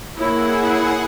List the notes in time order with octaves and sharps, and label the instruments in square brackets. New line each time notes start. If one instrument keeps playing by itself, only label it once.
[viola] A#3 [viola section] E4 [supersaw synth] G#4 F#5 [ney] C#5